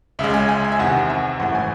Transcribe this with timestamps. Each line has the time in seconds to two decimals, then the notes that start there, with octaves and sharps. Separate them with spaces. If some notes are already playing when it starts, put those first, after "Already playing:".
0.19 C#2 C#3 G#3 E5
0.34 G#5
0.49 G#5
0.64 G#5
0.72 E5
0.79 E2 C3 D#3 F#5
1.10 E5
1.39 G#1 F#2 E3 A3 F#5
1.55 G#5